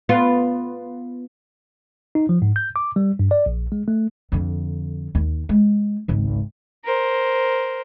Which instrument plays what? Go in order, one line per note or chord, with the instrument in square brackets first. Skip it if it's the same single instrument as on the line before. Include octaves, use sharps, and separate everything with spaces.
[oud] B3 F4
[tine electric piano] D#4
F3
G#2
G6
D6
G3
G2
D5
A#1
G#3
A3
[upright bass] F2 D3
D#2
G#3
G#1 C#2
[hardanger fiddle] A#4 C5